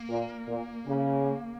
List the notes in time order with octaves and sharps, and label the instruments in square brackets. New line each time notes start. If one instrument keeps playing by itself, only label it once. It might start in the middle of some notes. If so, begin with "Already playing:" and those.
Already playing: [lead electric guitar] A#3
[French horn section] A#2
A#2
C#3